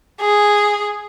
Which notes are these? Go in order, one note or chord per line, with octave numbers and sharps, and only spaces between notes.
G#4